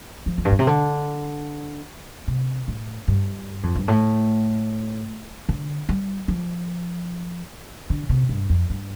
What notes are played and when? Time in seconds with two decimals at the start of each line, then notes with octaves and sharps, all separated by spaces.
0.26 F3
0.38 F2
0.45 G2
0.52 A2
0.59 C3
0.67 D3
2.28 C3
2.68 A2
3.08 G2
3.63 F2
3.75 G2
3.88 A2
5.49 D3
5.89 G3
6.28 F3
7.90 D3
8.09 C3
8.29 G2
8.50 F2
8.70 G2